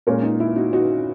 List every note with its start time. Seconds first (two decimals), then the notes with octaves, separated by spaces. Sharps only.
0.07 A#2 G#3 C#4 A#4 C#5
0.23 D#4
0.40 E4
0.56 D#4 F#4
0.73 D#4 F#4